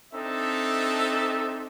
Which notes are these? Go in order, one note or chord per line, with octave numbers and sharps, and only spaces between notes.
C4 D4 D#4 A4 E5